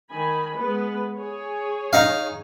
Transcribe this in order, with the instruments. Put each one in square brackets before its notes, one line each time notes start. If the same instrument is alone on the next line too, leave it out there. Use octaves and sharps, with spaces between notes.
[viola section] D#3 G#5 B5
G#3 B3 B4
G#4 C#5
[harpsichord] D#4 F5